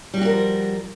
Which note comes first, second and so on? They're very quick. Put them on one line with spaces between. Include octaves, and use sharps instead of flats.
G3 F#4 G4 A#4 F3